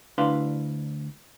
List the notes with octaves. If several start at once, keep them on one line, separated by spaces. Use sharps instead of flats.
D2 D4 E4 B4 F5 C6